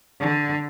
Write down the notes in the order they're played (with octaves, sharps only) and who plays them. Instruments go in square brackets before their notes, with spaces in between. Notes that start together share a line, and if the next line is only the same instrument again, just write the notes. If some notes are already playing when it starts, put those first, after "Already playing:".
[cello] D3